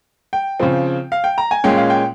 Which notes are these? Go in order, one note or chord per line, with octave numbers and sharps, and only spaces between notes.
G5
C#3 F3 C4
F5
G5
A#5
G#5
A#2 G#3 C#4 G5
F5
G5